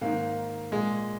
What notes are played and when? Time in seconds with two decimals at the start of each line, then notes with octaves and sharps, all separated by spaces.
0.01 G#2 D#3 A#3
0.72 A#2 G#3